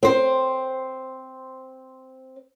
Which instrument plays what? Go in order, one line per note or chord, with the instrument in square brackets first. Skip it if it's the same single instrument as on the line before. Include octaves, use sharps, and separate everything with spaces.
[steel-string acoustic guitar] C4 C5